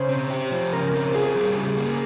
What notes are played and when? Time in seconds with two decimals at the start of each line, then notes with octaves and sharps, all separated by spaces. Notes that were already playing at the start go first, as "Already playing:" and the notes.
Already playing: C#3 C5 C#5
0.09 C4
0.30 G4
0.52 F3
0.72 C#3 A#4
0.93 C4
1.14 F4 G#4
1.35 G3
1.56 C#3
1.77 A#3